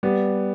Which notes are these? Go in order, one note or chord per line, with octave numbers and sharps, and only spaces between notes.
G3 B3